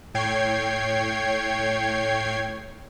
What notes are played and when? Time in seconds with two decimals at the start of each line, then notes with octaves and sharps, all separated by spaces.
0.14 A2 C#5 G5 G#6 C7